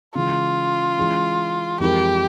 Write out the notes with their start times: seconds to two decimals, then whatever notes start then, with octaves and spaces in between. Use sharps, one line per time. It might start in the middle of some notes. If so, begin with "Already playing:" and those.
0.15 C#3 E3 G#3 F4
0.97 E3 G#3 C#4
1.80 F2 E3 G#3 E4 G4 A#4